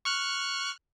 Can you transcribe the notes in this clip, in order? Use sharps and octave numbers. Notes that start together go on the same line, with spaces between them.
C#6 F6 F#6